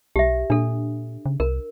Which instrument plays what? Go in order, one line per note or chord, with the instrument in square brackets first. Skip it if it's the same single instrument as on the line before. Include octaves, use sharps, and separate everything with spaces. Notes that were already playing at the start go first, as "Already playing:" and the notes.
[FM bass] B1 [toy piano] G4 E5
[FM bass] A#2 [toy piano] D4 A4
[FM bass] C#3
[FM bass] C2 [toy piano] A#4